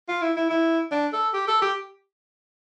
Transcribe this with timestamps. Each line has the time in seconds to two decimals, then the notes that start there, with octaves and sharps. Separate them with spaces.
0.08 F4
0.22 E4
0.36 E4
0.50 E4
0.92 D4
1.13 A4
1.34 G4
1.48 A4
1.62 G4